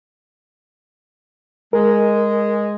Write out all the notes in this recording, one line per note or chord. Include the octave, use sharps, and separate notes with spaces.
G#3 A#4